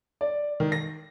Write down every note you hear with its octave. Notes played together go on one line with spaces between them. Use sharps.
D5
D#3
A#6